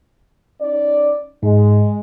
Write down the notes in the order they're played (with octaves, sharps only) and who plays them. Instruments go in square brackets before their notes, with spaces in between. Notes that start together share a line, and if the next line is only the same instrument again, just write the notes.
[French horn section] C#4 D#4 D5
[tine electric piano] G#2 [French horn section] G#3